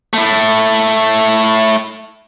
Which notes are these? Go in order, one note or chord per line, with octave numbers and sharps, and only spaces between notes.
A3 E4